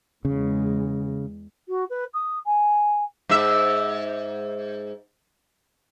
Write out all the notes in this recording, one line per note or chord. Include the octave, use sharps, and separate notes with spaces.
E2 C#3 G#3
F#4
B4
D#6
G#5
G#2 E5